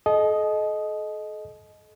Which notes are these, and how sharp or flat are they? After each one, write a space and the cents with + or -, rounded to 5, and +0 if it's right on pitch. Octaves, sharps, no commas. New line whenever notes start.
A4 -40 D#5 +0